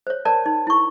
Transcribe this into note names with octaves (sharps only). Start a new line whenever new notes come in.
C5 C#5
A#4 C#5 D5 A5
D#4
E4 C#6